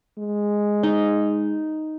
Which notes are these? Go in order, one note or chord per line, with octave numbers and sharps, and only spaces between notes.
G#3
D#4